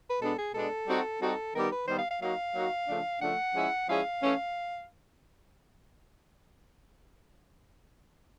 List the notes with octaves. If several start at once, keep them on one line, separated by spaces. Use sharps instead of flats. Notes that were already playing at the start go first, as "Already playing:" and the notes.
B4
B2 G#3 B3 D4 A4
G#4
B2 G#3 B3 D4 A4
G3 C4 D#4 F#4
G3 C4 D#4 F#4 A4
D#3 G3 B3 D#4 G4 A#4
B4
D#3 G3 B3 D#4 G4 C5
F5
F5
F#3 A#3 D#4 F#4 F5
F#3 A#3 D#4 F#4
C#3 F3 A3 D4
C#3 F3 A3 D4 F#5
F3 G#3 C#4 E4 G#4
F3 G#3 C#4 E4 G#4 F5
E3 A3 C#4